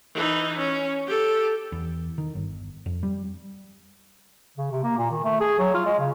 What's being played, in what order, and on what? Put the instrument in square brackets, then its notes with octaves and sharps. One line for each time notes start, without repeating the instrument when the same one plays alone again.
[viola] E3 D#4
C#4
G4 A4
[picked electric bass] E2
D#3
G1
F2
G3
[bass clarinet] C#3
C3
A#3
A#2
D#3
A3
G#4
F#3
F4
G#3
C#3